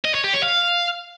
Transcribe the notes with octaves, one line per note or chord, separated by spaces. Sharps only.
D#5
C#5
G4
C#5
F5